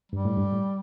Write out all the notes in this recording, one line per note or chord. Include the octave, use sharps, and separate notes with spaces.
G2 G3
A2
G2
A2